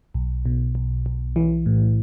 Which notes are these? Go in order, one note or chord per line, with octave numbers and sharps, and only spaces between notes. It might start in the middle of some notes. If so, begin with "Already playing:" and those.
B1
B2
B1
B1
E3
A2